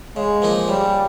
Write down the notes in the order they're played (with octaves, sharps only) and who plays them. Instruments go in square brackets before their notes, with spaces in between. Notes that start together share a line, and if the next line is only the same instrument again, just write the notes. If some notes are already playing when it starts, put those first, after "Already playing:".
[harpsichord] C#3 [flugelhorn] G#3
[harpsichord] F3 A#3 D#4
[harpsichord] C#3 [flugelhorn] G3